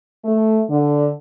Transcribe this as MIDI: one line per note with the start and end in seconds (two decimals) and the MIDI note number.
0.25 0.61 57
0.69 1.10 50